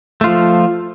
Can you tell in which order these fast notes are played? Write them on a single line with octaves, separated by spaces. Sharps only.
A3 F4 F3